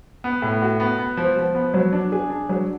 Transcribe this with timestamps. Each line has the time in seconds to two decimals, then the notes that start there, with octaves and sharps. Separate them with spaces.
0.24 B3
0.42 A2
0.62 F#4
0.80 B3
0.98 B3
1.17 F3
1.37 F3
1.55 B3
1.74 F#3
1.93 D4
2.12 G#4
2.30 D4
2.49 F#3